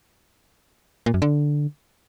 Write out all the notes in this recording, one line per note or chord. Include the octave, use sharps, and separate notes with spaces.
A#2
F#2
D3